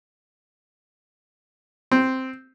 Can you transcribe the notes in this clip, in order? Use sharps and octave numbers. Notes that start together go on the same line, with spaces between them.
C4